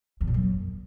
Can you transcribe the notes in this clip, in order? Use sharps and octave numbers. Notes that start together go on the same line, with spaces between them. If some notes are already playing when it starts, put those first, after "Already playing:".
E2
A#2
F#2